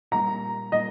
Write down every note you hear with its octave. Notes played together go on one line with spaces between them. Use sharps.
A#2 G3 A#3 A#5
A#2 G3 A#3 D#5